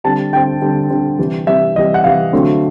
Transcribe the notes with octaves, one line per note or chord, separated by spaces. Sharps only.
D3 G3 C4 A5
D3 G3 C4 G5
D3 G3 C4
D3 G3 C4
C3 E3 G3
C3 E3 G3 E5
C3 E3 G3 D#5
F#5
C3 E3 G3 F5
D3 F#3 A3 C4